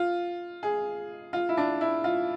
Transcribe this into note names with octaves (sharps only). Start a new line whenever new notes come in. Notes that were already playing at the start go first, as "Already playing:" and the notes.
Already playing: F4
G#4
F4
E4
D4
E4
F4